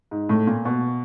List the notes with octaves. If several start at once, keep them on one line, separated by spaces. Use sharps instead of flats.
G#2
A2
A#2
B2